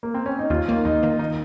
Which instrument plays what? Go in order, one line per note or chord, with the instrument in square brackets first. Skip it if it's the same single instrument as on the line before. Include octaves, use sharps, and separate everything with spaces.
[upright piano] A#3
C4
C#4
D#4
[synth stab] D#2 [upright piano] F4
[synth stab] D#3 A#3
[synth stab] D#2 [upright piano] D#4
[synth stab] D#3 A#3
[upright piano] D#4